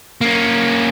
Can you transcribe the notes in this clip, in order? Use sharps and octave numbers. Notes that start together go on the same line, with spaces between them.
A#3 C#4